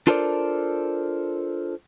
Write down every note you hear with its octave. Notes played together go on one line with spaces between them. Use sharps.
D4 F4 A4 A#4 C5 D5